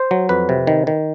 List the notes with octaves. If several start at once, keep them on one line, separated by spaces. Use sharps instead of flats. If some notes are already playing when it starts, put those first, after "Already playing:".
Already playing: C5
F#3
F2 B4
C3
D#3
D#3